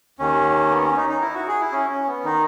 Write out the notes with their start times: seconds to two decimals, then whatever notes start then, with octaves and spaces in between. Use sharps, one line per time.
0.19 D#2 D#3 C#4
0.71 B3
0.83 C#4
0.97 D#4
1.09 D#4
1.21 E4
1.35 F#4
1.48 G#4
1.61 E4
1.72 C#4
1.90 C#4
2.07 B3
2.24 D#3 D#4